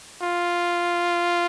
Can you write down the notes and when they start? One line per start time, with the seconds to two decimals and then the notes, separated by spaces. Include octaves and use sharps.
0.23 F4